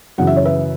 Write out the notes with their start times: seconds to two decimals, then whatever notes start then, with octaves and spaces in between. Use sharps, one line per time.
0.18 F#2 C#3 E3 F#5
0.27 E5
0.36 C#5
0.45 B4 E5